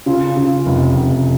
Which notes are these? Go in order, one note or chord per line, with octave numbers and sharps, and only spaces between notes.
C#3 F4
C#3
F1
F1